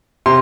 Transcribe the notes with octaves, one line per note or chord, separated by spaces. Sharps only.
C3 C6